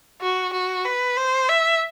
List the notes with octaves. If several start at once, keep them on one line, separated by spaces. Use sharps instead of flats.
F#4
F#4
B4
C5
E5